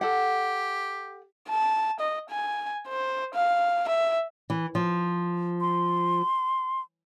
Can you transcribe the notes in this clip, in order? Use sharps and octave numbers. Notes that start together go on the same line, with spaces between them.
G4 A4 F#5
A5
D#5
G#5
C5
F5
E5
E3
F3
C6